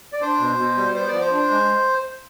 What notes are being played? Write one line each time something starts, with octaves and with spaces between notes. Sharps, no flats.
D5
D4 C5
B2
B2
G3
B3 C5
D5
F3
C5
D4
G#3